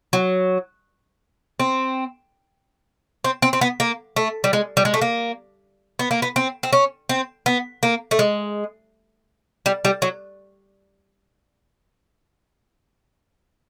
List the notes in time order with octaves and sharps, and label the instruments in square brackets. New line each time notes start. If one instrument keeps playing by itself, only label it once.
[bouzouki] F#3
C4
C4
C4
C4
B3
A#3
A3
G3
G#3
G3
G#3
A3
A#3
B3
A#3
B3
C4
C4
C#4
C4
B3
A#3
A3
G#3
G3
G3
F#3